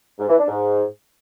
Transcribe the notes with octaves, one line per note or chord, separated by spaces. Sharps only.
G#2
E3
D4
G#2